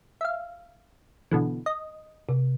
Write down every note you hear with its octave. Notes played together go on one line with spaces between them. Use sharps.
E5 F5
B2 D3 E3
D#5
C3